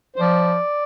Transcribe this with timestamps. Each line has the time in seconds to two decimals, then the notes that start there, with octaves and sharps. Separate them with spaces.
0.16 C5
0.20 F3 D5